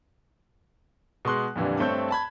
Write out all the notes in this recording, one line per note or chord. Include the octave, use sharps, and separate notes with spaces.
B2 G#3 C6 F#6
F2 A#2 D3 E3 G3
G2 A3 C4 C#5 E6 G6
A5 B5 G#6